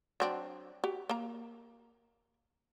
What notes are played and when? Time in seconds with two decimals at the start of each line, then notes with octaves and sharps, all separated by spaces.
0.20 F#3 C4 D4
0.84 F#4 G4
1.09 A#3 A#5